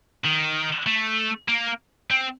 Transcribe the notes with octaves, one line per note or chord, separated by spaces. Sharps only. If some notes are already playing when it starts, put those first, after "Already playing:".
D#3
A3
A#3
C4